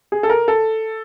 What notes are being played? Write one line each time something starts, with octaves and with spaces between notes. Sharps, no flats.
G#4
A4
A#4
A4